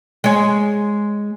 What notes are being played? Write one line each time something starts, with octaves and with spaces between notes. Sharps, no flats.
G#3 C#5